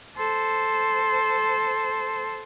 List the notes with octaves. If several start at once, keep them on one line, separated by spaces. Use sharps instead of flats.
A4 C5